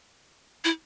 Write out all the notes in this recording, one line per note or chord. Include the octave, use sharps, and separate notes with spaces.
E4